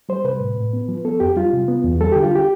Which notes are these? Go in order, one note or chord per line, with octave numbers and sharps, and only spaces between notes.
G3 C5
C3 B4
A2
A2
B3
F3
B3 A4
F2 G4
G3 F4
C3
B3
E2
G3 A4
D3 G4
F4
G4